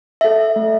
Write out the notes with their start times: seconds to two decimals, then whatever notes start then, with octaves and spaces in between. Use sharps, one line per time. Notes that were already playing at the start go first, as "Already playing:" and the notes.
0.21 A4 E5
0.56 A3